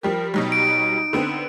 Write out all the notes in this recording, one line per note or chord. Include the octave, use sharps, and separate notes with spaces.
F3 G3 G4 A#4
B2 F#3 G3 D#4
D7
D3 B3 C4